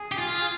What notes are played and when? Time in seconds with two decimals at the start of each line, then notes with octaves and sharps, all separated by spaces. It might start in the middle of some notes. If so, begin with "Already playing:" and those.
Already playing: G#4
0.12 G4
0.19 F4